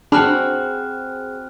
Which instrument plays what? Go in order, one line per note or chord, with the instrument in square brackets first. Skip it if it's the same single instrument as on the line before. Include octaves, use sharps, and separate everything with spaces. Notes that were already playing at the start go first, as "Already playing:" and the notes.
[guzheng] C4 F#4 F#5 [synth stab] D4 [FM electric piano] G#4 [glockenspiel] B5 F6 F#6